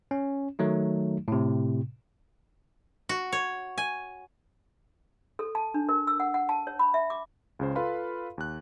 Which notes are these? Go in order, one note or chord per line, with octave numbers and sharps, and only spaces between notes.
C#4
D#3 F#3 A3 D#4
A2 C3
F#4
C#5
G#5
A4
A5
D4
A#4
E6
F#5
F#5
A5
C#5
B5
E5
D6
C#2 C#3 C5
F4 A4 B4 F5 B5 C6
D#2 F#6